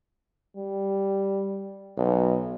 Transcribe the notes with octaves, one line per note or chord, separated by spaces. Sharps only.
G3
B1